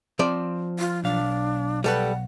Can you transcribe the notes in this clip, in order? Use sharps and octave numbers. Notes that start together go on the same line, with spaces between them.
F3 C4 D5
F4
B1 D4 F5
G3 A4 B4 F#5